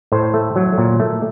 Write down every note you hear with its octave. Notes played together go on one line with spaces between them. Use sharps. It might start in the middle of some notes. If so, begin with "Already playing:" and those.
A2 C5
A3
F#3
A#2
A3